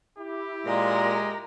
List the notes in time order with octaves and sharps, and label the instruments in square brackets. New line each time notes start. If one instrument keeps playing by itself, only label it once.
[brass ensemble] E4 G4
[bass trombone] A#2 [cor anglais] G#3 [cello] A#4